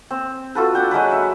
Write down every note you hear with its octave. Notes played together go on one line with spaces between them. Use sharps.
C4
F4 F#4 A4 B4
D4 F#5 G5
F#3 G#3 A#4 B4
C#5 E5